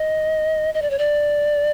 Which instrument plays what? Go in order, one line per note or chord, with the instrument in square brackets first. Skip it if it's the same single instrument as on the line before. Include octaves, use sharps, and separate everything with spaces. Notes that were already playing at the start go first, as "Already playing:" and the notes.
Already playing: [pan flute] D#5
D#5
D5
C#5
D5